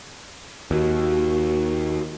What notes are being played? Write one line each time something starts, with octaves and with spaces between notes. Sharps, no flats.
D#2 F#4